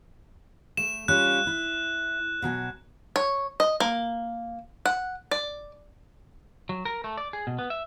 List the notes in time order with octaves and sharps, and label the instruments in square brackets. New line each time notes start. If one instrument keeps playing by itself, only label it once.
[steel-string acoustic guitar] A3 [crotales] E7
[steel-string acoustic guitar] G3 C#4 F4 [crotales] F#6
[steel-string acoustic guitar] E4
B2 F#3 G#5
[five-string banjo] C#5
D#5
A#3
F#5
D5
[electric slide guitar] F#3
A#4
A3
D5
G#4
B2
B3
E5